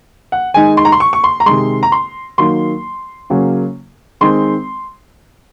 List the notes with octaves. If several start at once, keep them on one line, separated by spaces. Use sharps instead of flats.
F#5
D#3 G#3 D#4 G#5
C6
A#5
C6
C#6
C#6
C6
A#5
C3 D#3 G#3 C6
A#5
C6
D#3 F#3 A#3 C6
C#3 F#3 A#3 C#4
D#3 G#3 C4 C6